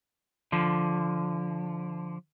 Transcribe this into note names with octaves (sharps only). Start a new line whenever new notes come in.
D3 F3